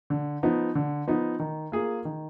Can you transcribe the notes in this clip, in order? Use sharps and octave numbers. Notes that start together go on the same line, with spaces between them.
D3
F3 B3 D#4
D3
F3 B3 D#4
D#3
A#3 F4 G#4
D#3